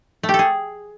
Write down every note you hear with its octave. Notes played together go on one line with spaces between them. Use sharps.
A3
G4
A4
G#4